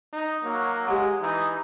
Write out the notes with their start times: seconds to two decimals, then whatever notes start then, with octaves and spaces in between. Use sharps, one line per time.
0.13 D#4
0.44 F#3 A#3
0.88 G#3 G4 F#5
1.22 E3 D#4